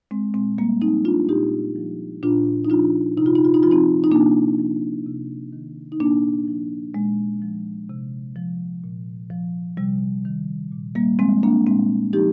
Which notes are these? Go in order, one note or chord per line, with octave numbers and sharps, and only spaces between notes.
G#3 C4
A#2 G#3 C4
G3 A#3
F3 C4 D#4
D4 F4
A#2 D#4 G4
F3
A#2 D4 F4
D#4
F3 D4 F4
C3 D#4
F4
D#4
F4
D#4
F3 F4
C4 D#4
D#4
C3 A#3 D4
F3
C3
D#3
D#4
A#2 A#3 D4
F3
A#2 G#3
F3
C3
F3
A#2
F3
C3 G3
D#3
A#2
G3 A#3
F3 G#3 C4
A#3 D4
A#2 G#3 C4
F3 D#4 G4